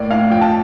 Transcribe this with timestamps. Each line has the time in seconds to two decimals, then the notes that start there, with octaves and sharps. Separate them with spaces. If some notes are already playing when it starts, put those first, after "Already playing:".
Already playing: A2 A#3 D5
0.11 A2 F5
0.31 F2 G5
0.41 A5